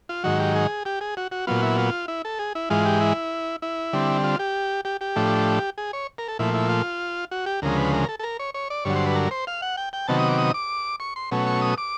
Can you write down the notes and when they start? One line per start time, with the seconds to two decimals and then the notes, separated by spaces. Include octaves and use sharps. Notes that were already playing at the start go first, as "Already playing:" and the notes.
0.09 F4
0.24 G#2 D#3 F#3 F#4
0.40 G4
0.56 G#4
0.85 G4
1.01 G#4
1.17 F#4
1.32 F#4
1.47 A#2 F#3 B3 F4
1.63 E4
1.78 F4
2.08 E4
2.25 A4
2.39 G#4
2.55 E4
2.70 G#2 E3 G#3 F4
2.85 G4
3.01 E4
3.62 E4
3.93 D3 G3 C4
4.24 F4
4.39 G4
4.85 G4
5.01 G4
5.16 A2 F3 A3 D4
5.78 G#4
5.93 C#5
6.18 A#4
6.28 A4
6.39 A#2 F3 A3 E4
6.54 E4
6.69 F4
7.31 F#4
7.46 G4
7.62 D2 C#3 F3 G#3 A#4
7.78 B4
7.94 A#4
8.09 A4
8.19 A4
8.23 A#4
8.39 C#5
8.54 C#5
8.70 D5
8.85 G2 D3 F#3 C#5
8.95 C5
9.06 B4
9.16 A#4
9.31 C5
9.47 F5
9.62 F#5
9.77 G5
9.93 G5
10.08 C3 D#3 F#3 B3 A5
10.19 D#6
10.29 D6
10.38 D#6
10.54 D6
11.00 C#6
11.16 C6
11.31 B2 F#3 A3 C#4
11.46 C#6
11.61 D#6
11.78 D6